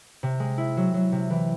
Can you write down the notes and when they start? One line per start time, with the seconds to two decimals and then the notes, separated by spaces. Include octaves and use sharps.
0.23 C3
0.40 G#3
0.58 E4
0.77 F#3
0.94 F#3
1.12 C3
1.30 E3